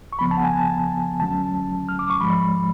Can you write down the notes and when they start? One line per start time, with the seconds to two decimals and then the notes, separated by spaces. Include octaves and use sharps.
0.13 C#6
0.19 C#2 C#3 F3 B3 B5
0.31 A5
0.37 F#5
0.44 G#5
0.56 A5
1.20 D2 D3 F#3 A3 C#4 A5
1.89 F6
1.99 D6
2.10 C#6
2.20 G#2 F3 G#3 B5